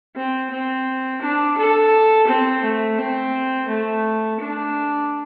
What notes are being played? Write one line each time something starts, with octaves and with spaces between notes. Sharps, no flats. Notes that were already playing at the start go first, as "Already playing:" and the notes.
C4
C4
D4
A4
C4
A3
C4
A3
D4